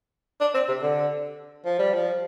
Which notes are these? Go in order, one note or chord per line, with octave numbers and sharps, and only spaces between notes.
D4
C4
C3
D3
F3
G3
F3